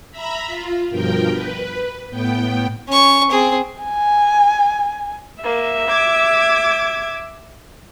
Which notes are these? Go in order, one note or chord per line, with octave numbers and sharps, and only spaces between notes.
E5 A#5 B5
F4
G2 B2 F3 A#4 G5
B4
A2 B3 G5
C#4 C#6
C4 G#4
G#5
A#3 E5
D6 G#6